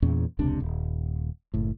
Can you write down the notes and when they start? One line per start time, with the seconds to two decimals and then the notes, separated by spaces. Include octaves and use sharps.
0.02 E2 A#2 C#4
0.39 E1 C#2 C3 D4
0.60 D#1
1.54 F#1 A2